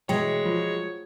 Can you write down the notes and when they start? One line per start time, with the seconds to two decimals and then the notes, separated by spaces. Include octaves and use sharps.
0.09 B2 E3 F#3 G#3 C#5 G5
0.45 F3 F4